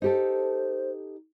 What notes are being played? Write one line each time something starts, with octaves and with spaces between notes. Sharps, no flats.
D#4 G4 A4 C5